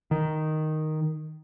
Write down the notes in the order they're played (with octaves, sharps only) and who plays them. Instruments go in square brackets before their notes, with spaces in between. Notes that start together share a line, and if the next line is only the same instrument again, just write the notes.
[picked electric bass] D#3